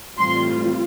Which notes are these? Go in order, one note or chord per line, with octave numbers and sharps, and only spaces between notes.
A2 E3 G3 C4 F4 C6